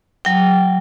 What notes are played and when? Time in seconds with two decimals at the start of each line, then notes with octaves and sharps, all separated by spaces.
0.25 F#3 G5